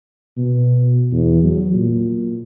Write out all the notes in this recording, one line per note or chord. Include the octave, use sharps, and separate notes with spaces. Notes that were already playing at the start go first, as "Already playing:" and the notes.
B2
E2
F#3
A#2